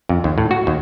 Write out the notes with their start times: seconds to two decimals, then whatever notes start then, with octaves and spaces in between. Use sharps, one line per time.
0.09 F2
0.24 D#2
0.38 A2
0.51 F#4
0.67 D#2